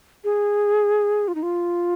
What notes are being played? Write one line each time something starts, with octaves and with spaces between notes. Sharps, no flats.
G#4
F4
D#4
F4